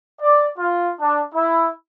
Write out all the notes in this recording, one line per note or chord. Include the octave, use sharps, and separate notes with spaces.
D5
F4
D4
E4